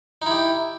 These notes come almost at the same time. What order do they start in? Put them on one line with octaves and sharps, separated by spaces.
D#4 E4 G4